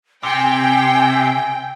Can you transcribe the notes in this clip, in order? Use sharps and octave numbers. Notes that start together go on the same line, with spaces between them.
C3 G5 G#5